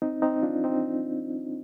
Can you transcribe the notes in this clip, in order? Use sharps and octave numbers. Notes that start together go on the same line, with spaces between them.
C4 D#4
C4 D#4
D4 F4
C4 D#4